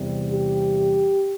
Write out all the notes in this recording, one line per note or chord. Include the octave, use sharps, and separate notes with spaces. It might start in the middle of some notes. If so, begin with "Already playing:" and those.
Already playing: E2 C3 G3
G4